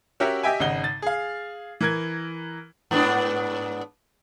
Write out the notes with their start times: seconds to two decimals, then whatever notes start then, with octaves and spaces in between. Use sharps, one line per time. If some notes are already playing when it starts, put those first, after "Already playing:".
0.20 C#4 F#4 G4 A#4 E5 F#5
0.43 G4 D#5 E5 G5 G#5
0.60 G#1 C#3 D#4 F#5 G7
0.84 A6
1.02 G#4 F5
1.81 E3 A#4 G#6
2.91 G#2 B3 D4